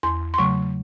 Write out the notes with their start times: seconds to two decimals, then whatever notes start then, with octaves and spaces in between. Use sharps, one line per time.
0.03 E2 C6
0.34 C6
0.38 C#3 F#3 A3 C#6